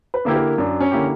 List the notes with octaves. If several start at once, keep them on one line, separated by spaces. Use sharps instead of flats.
B4
D3 A#3 E4 G4
A#4
F#2 D4
C#4
D3 A#3 E4 G4